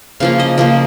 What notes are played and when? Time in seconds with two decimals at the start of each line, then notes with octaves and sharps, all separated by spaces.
0.20 C#3 F3 A#3 F5
0.40 D#5
0.58 C#3 F3 A#3 A#4